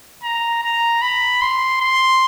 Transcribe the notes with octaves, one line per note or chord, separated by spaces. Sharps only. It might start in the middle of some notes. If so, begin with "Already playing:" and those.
A#5
A#5
B5
C6
C6